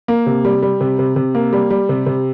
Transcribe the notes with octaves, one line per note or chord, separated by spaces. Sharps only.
A#3
C3
G3
G3
C3
C3
C3
A#3
G3
G3
C3
C3